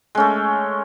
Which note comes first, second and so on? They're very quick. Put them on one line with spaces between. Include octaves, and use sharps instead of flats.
G#3 C#4 A3